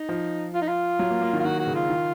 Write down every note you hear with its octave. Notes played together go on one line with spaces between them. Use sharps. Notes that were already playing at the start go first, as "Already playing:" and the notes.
Already playing: D#4
F3
F4
D#4
F4
F#3
A#3
A#3
D#3
F4
D#3 F#4
F#4
C#3
F4
D#3